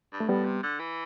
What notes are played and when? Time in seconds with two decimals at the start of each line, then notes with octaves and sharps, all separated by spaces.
0.12 G2
0.20 A3
0.29 A2 G3 B3
0.46 C3
0.63 D3
0.79 E3